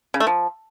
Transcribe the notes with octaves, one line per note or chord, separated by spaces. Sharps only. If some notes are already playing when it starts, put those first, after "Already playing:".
C#3
A3
F3